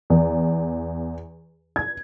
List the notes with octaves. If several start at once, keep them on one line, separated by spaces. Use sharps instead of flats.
E2
G#6